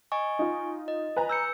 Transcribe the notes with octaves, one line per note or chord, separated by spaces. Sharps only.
D#5 G#5 C#6
D#4 F4
D#5
B4 G#5 A#5
E6 G6 C#7